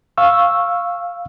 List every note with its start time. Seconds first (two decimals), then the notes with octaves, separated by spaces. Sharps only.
0.18 F5 C#6 E6